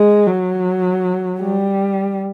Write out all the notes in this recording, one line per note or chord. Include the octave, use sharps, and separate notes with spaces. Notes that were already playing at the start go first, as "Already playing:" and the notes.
Already playing: G#3
F#3
G3